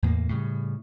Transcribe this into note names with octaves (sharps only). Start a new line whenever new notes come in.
E2 A2 A3 A#3
A2 C#3 G3